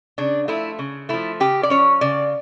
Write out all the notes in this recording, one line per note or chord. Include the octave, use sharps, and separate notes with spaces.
C#3 D4
F3 A3 E4
C#3
F3 A3 E4
C#3 G4
D5
F3 C#4 C#5
C#3 D5